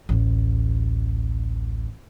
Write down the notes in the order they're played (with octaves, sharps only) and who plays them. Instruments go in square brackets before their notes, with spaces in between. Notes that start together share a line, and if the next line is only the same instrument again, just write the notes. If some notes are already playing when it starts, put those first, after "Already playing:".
[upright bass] A1 D2